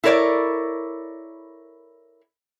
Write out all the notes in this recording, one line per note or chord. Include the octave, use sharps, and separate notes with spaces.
E4 A4 A#4 C#5 D5